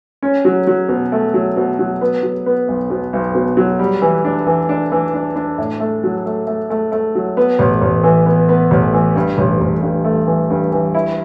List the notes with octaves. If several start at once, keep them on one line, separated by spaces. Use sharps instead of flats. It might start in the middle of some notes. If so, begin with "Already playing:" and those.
C#4
F#3
F#3
B2
A3
F#3
B2
F#3
B3
F#3
B3
B1
B2
B1
B2
F#3
G3
E3
D4
E3
D4
E3
D4
D4
A2
A3
F#3
A3
A3
A3
A3
F#3
B3
A1
A1
E3
B3
B3
A1
E3
G2
A1
A1
G2
A3
E3
G2
E3
E4